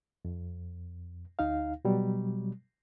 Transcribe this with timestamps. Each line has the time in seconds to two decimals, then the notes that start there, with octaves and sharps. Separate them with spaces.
0.25 F2
1.39 D2 D#4 F5
1.85 B2 F#3 G3